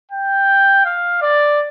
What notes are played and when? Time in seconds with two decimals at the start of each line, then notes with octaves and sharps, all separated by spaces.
0.12 G5
0.86 F5
1.22 D5